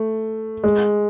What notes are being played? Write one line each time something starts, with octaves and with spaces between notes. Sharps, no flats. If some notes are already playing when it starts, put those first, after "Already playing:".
Already playing: A3
G#3